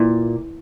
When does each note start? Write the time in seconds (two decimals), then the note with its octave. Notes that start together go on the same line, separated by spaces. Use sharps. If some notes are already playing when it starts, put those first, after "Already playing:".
Already playing: A#2 E4